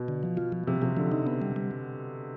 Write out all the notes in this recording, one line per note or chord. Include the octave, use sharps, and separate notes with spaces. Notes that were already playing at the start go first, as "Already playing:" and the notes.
Already playing: B2
D3
F3
F4
F3
C3 F3
C3 F3
D3 F3
D#4
B3
G3
G3